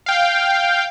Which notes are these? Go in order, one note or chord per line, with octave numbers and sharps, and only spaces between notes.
F5 G5